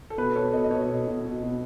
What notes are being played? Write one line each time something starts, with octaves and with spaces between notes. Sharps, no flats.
A4
B2 B4
B2 A4 C#5
B2 B4 D#5
D#5
B2 A4 C#5
B2
B2
B2
B2